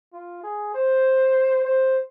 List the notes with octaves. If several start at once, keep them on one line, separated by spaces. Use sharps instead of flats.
F4
G#4
C5
C5